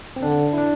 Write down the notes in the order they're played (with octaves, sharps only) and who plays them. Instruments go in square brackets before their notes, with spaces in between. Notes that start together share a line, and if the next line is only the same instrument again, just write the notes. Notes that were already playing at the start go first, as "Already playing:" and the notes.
[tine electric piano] C4
[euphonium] D3 [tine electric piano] D4
[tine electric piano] E4
D4